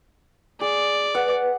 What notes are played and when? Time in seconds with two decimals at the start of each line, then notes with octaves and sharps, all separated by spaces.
0.61 G#4 D5
1.15 B4 F#5